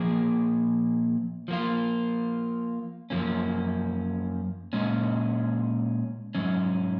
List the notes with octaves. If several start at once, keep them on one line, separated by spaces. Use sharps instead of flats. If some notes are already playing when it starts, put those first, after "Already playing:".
Already playing: A#2 F3 A#3 G#4
F3 A#3 F4
F#2 F3 A#3 C#4
A#2 G#3 C#4
G#2 F#3 C#4